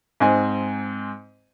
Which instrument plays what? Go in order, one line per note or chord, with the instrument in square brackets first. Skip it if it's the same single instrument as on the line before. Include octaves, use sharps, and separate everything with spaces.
[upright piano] G#2 G#3 C4 G#5